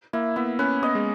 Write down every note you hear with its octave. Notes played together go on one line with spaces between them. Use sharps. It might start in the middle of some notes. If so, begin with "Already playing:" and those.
A#3 E4
B3 E4
C#4 B4
B3 D#5
G#3